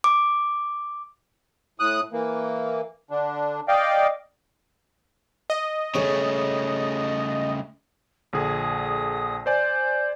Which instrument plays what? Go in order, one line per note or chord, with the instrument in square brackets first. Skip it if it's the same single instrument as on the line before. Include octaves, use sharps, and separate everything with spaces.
[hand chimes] D6
[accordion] A2 D#6 F#6
E3 A#3
D3 D4
D5 D#5 F5 G5
[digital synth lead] D#5
[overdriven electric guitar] C#3 A3 [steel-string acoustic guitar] G#4 C#5
[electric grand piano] A#1 D3 G#4 [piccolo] D#6
[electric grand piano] C5 D5 G#5 [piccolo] G6